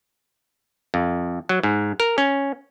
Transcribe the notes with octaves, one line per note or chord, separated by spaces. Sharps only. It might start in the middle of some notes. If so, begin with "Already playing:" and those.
F2
F#3
G#2
A#4
C#4